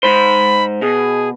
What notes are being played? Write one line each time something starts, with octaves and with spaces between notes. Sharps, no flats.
G#2 C5 B5
B2 G#4